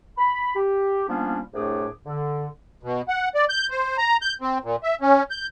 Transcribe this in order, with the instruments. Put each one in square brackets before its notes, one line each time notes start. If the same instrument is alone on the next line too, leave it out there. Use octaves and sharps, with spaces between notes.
[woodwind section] B5
G4
F3 G3 A#3 B3 C#4 D4
C2 A2 A3 D4 G#4 D6
D3
[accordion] B2
F#5
D5
G6
C5
A#5
G6
C4
A#2
E5
C#4
G6